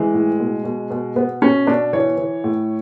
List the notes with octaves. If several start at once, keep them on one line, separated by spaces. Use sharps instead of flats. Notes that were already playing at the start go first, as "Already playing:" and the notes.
Already playing: E3 G#3
A2
B2
B2
B2
B2 B3
B2 C#4
B2 D4
E3 C#5
E3
A2